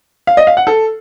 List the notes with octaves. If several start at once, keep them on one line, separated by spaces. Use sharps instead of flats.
F5
D#5
F5
F#5
A4